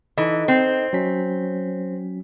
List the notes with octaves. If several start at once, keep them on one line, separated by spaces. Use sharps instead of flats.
E3 D#4 A4 D#5
C4
F#3 C#4 B6